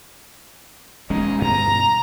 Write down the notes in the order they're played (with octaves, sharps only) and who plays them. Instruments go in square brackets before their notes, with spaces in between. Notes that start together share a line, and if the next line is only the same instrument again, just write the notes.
[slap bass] E1 G#3 C#4 [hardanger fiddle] D#4
[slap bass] G2 B2 [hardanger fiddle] A#5